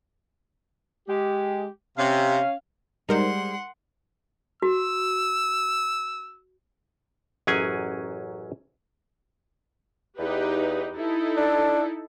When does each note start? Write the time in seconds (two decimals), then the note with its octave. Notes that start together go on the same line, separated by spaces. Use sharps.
1.08 G#3 G4
1.98 C3 C#4 F5
3.09 G3 G#3 D#4 A#4 C5 F#5 C6
4.62 F#4 E6
7.47 A1 F#2 F#3 C#4 G#4 G#5
10.19 E2 D#4 G4 B4
10.96 D#4 E4 A4
11.37 D4